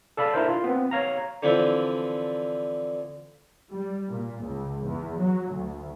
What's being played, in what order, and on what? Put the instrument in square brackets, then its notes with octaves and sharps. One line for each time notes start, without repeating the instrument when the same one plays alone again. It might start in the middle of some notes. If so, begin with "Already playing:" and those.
[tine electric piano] A4 D5 F5 B5
D4 E4 A#4 C5
F4
B3 C4
C#5 F5 A#5
[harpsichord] D3 E3 F3 C4 D4 E4
[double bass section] G3
A#2
C#2
E2
F#3
D2